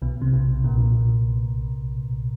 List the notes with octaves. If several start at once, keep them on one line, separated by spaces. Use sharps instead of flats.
B1 B2
C3
B1 B2
A#1 A#2